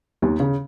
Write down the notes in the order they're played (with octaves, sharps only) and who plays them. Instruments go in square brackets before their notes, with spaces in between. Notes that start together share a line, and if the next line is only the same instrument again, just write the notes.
[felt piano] D#2 D#3
C#3